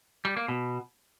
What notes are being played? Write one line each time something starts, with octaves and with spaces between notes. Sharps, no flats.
G3
A#3
B2